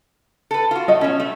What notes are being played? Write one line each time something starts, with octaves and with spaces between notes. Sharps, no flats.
A4 B4
F4 F#4
A3 F#4 D#5
B2 C#4
A3